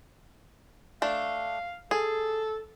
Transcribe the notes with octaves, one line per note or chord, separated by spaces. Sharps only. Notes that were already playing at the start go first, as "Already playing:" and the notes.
A3 D4 F5
G#4 A4